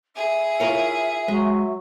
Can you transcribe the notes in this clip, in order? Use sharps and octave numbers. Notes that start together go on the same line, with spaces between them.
G#4 E5
E4 F4 A#4 C#5
F#3 G#3